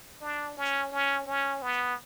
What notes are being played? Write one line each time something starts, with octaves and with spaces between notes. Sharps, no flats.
D4
C#4
C#4
C#4
B3